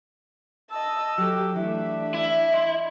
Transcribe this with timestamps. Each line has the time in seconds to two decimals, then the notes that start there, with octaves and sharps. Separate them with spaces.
0.71 D#5 A5 E6
1.18 F#3 G4 A4
1.56 E3 A3 D4 E5
2.14 E4
2.52 D#5 C6